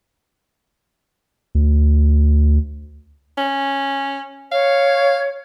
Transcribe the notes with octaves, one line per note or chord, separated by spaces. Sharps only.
D2
C#4
C#5 F5